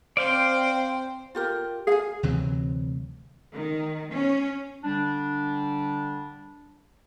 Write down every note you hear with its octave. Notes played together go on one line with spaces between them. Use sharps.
C4 C5 D5 F5 G5
F4 G4 A#4
G#4 F5 G#5
D2 C3 E3 F#3
D#3
C#4
D3 G3 D4